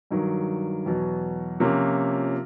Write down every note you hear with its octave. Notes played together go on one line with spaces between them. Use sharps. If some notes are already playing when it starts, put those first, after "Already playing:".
G2 D#3 F#3
E2 B2 F#3
C3 F3 A#3 C#4